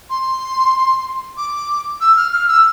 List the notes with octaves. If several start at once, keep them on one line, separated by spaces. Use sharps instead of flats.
C6
D6
E6
F6
F6
E6